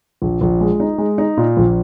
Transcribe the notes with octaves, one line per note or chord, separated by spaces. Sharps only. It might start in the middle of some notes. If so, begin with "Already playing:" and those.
A#1
A#1
G#3
D#4
G#3
D#4
A#2
A#1